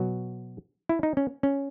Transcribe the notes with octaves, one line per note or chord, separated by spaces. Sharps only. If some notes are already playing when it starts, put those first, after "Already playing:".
Already playing: B2 F#3 F#4
E4
D#4
C#4
C#4